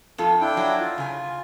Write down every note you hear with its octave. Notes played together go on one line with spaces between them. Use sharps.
F2 F4 A4
D4 E4 G5
F#3
F4
C#3 G#5